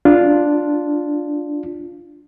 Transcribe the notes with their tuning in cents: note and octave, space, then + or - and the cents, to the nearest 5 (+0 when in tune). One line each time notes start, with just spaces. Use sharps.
D4 +0 F4 +0